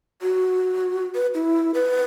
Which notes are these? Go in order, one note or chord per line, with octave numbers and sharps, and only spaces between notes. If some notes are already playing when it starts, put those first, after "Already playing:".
F#4
B4
E4
B4